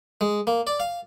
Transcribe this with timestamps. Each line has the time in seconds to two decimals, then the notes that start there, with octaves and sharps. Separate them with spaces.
0.21 G#3
0.47 A#3
0.67 D5
0.80 F5